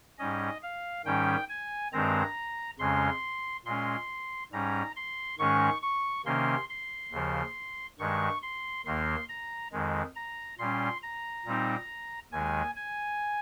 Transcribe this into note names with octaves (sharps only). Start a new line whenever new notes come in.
G#2 G3 C#4 D#5
F5
G#2 D#3 G3 C#4 G5
G#5
G2 D#3 G#3 C4 A#5
F2 C#3 G#3 C#4 C6
A#2 G#3 C#4 C6
G#2 G3 C#4 A#5
C6
G#2 D#3 G#3 C#4 C#6
C#6
C3 D#3 A#3 C#4 C6
C6
D#2 C#3 F3
G2 D#3 G#3 C#6
C6
D#2 D#3 A#3 C6
A#5
F2 D#3 G#3
A#5
A#2 G3 C#4 C6
A#5
A#2 G3 C4 D#4
D#2 D#3 G#3 G#5
G#5